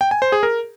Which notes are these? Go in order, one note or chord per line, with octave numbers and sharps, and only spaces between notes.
G5
G#5
C5
G#4
A#4